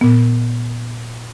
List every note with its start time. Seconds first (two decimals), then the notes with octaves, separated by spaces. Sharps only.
0.01 A#2 B3